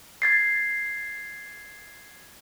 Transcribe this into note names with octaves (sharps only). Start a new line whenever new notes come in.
G#6 A6 C7